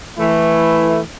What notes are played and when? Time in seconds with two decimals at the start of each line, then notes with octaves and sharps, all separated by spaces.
0.17 E3 A3 E4